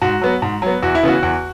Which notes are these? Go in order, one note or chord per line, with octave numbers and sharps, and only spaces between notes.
G#2 F#4
F#3 B3
G#2
F#3 B3
E2 F#4
E4
C#3 E3 B3 F#4
E2